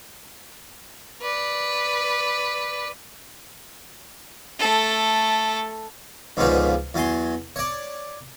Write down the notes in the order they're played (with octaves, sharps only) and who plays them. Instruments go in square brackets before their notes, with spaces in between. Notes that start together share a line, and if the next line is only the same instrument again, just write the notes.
[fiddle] B4 D5
A3 A4
[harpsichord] C#2 G#2 B2 D3 F3 C#4
E2 F#3 G#5 C6
C#5 D5